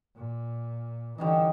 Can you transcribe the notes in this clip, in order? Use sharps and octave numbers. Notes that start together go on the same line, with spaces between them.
A#2
D3 E3 G3 C#4 D#4